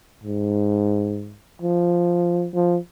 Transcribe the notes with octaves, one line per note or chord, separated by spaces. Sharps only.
G#2
F3
F3